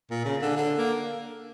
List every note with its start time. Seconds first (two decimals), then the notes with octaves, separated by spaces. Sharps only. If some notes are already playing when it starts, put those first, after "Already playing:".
0.11 A#2
0.25 C#3
0.42 D3
0.57 D3
0.78 A#3